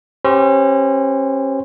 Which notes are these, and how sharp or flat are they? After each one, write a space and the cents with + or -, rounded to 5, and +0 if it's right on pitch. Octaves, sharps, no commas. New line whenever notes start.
C#4 -35 G4 +0 C5 -25